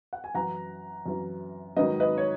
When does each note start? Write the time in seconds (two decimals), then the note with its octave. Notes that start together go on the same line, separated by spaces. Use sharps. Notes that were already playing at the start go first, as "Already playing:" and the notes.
0.13 F#5
0.24 G#5
0.35 F#2 E3 F#5 A#5
1.06 F#2 E3
1.77 G#2 D#3 F#3 B4 D#5
2.00 B4 D#5
2.18 C#5